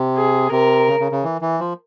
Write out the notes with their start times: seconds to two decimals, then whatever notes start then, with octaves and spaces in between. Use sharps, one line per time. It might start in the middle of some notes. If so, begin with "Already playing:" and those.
Already playing: C3
0.17 G#4
0.52 C3 A#4
0.88 C#3
1.00 C#3
1.12 C#3
1.24 E3
1.41 E3
1.60 F3